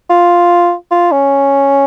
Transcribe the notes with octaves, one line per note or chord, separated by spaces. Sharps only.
F4
F4
C#4